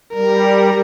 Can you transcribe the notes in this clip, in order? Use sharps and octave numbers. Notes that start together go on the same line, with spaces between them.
G3 A#4